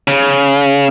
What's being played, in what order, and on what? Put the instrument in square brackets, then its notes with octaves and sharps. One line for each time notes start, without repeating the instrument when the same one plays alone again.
[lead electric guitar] C#3